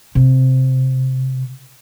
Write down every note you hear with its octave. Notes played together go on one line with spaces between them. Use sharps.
C3